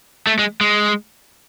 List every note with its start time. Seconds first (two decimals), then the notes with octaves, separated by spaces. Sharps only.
0.27 A3
0.39 G#3
0.61 G#3